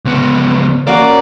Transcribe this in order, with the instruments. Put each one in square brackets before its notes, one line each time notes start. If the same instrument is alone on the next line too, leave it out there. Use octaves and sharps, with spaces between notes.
[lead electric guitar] C#2 B3
[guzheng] A#3 C#4 F#4 [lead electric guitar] D5